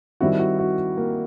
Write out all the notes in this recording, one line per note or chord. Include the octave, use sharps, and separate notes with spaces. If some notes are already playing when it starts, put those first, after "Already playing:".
D#3 G3 C4 E4 F#4
F#4
F#4
A#3